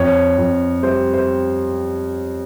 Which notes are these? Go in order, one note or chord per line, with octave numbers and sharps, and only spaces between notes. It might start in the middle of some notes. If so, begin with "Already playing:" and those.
Already playing: F2 C#5
F2
G3 C5
C5